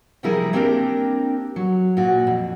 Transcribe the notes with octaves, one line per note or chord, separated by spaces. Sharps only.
C3 F3 G3 E4 G#4 A#4
A#3 C4 D4 G4 A#4
F#3
A#2 F#4
F2